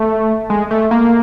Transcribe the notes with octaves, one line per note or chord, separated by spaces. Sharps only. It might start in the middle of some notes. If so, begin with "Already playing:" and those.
Already playing: A3
G#3
A3
A#3